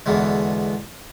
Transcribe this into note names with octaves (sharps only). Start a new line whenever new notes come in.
E2 B2 D3 E3 G#3